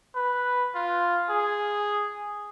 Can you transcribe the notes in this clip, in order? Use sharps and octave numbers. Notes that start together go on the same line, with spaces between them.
B4
F4
G#4